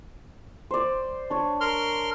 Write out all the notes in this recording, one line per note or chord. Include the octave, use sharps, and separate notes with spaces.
C5 D5
D4 C#5
A#4 C6 F6